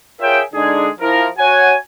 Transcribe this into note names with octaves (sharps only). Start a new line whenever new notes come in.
F4 G#4 A#4 C#5 E5 G5
D3 G#3 D4 D#4 G#4
F3 E4 A#4
F#4 C#5 G#5